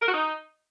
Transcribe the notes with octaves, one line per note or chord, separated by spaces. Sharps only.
A#4
F#4
D#4